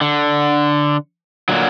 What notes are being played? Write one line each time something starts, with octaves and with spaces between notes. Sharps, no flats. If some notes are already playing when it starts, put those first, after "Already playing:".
D3
A#2 D3 F#3